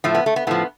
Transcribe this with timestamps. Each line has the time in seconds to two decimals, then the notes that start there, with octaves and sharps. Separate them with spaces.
0.04 A2 F3 A3
0.15 B3
0.26 A3
0.36 B3
0.47 A2 F3 B3